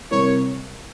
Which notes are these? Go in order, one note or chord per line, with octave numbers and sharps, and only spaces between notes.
C3 G3 C4 E4 A#4 C#5